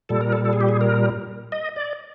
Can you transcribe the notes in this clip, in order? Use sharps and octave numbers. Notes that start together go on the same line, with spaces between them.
A#2 G3 A4
A#4
A4
A4
G#4
G4
G#4
A#4
D#5
D5